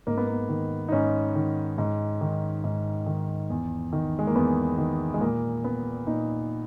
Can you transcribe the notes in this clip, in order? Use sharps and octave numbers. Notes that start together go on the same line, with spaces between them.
G#2 A#3
B3
A#3
D#3
D#4
G#2 C#4
D#3
G#2
D#3
G#2
D#3
E2
D#3
G#3
A#3
E2 B3
D#3
G#3
A#2 A#3
B3
A#2 D#4